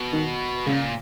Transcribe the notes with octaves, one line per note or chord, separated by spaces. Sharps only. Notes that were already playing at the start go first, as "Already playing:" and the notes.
Already playing: B2
D#3
A#2 C#3